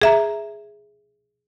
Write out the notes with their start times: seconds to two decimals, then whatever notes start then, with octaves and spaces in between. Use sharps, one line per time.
0.02 G#4 E5 A#5